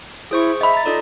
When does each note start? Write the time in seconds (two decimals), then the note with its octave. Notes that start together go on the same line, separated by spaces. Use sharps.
0.31 E4 G#4 C5 C#6
0.61 D#5 E5 B5
0.73 A#5 A6
0.86 D#4 F4 A4 D5